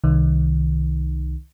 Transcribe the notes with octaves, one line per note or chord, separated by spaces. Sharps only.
C2 D#3